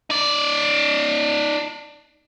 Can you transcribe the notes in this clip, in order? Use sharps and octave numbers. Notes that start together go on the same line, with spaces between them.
D#4 D5